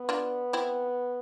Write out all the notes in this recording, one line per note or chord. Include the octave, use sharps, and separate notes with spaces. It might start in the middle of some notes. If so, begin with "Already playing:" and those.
Already playing: B3
D4 F4
C4 E4